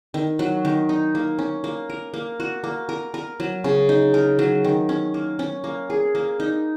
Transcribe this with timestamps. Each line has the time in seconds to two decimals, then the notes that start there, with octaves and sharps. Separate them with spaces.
0.14 D#3
0.39 F#3
0.65 D#3
0.89 D#4
1.15 A#3
1.39 C#4
1.64 A#3
1.90 A#4
2.14 A#3
2.40 F#4
2.64 A#3
2.89 A#4
3.14 A#4
3.40 F#3
3.64 C#3
3.89 D#4
4.14 A#4
4.39 F#3
4.64 D#3
4.89 C#4
5.14 A#3
5.39 C#4
5.64 A#3
5.90 G#4
6.15 A#3
6.40 D#4